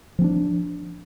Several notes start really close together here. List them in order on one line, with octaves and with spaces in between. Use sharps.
F3 C4 D4